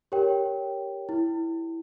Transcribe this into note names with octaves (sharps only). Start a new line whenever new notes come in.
G4 A#4 C#5 G5
E4